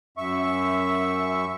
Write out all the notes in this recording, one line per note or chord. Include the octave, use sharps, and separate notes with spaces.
F#2 E5 C#6